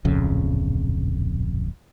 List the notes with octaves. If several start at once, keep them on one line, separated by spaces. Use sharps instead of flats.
D1 A#1 F2 C#3